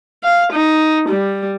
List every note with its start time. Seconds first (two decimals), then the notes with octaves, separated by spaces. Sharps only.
0.24 F5
0.53 D#4
1.09 G3